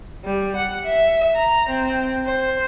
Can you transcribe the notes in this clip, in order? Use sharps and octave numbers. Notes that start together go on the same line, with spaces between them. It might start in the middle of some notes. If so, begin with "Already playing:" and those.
G3
F#5
E5
A#5
C4
C5